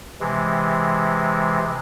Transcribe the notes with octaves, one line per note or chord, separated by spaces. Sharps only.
C3 E3 G#3